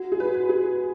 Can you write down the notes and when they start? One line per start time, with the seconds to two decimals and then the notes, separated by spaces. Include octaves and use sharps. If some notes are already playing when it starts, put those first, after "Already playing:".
Already playing: F#4
0.12 G#4
0.20 B4
0.34 F#4
0.49 G#4